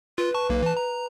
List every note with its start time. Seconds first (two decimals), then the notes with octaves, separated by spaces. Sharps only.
0.18 F4 B4
0.34 A5 C#6
0.50 B1 A#3
0.63 E3 A5
0.77 A#5